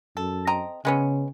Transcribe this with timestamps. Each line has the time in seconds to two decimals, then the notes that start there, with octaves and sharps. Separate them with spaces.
0.17 F#2 A4
0.47 C4 D#5 A#5
0.85 C#3 G#3 B3 C#4